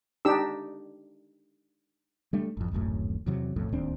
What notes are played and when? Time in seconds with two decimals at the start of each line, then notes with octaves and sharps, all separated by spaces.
0.25 D4 D#4 G4 E6
2.33 G3 A3 D4
2.57 G#1 F2
2.71 D1 G#1 F#2 A2
3.26 E2 C3 F#3
3.56 B1 F2 A2
3.72 D1 D#2 C4 D4